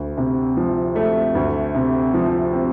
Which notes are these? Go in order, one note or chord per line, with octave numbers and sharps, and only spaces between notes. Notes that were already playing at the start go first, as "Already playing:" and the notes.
Already playing: D2
C3
F3
A3
D2
C3
F3
C4